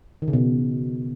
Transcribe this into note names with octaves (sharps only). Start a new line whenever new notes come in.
D#3
C#3
B2